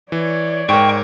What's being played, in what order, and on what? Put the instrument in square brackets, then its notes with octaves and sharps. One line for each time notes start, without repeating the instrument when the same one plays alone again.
[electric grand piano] E3 [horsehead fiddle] C#5 D5
[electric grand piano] G#2 A#4 [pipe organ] G5 C#6